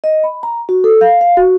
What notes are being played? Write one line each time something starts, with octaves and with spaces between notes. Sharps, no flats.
D#5
B5
A#5
F#4
A4
F5
F5
F#4